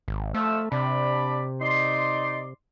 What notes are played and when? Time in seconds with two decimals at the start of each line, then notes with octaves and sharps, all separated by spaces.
0.08 G#1
0.34 F2 F3 A3 E6
0.72 C3 D4 D5 B5
1.61 D#4 D5 C6